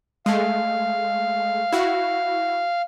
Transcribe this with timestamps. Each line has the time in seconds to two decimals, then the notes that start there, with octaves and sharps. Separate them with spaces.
0.26 G#3 A3 F5
1.72 E4 F#4